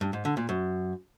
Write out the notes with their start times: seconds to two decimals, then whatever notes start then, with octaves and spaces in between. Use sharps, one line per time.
0.01 G2
0.13 G#2
0.25 D3
0.37 A#2
0.49 F#2